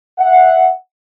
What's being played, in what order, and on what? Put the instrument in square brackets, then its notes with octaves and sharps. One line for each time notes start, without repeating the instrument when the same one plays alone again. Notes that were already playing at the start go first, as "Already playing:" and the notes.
[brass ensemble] E5 F#5